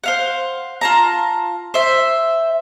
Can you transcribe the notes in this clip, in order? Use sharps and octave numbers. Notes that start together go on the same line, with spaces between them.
C5 F5 F#5
F4 A5 A#5
C5 E5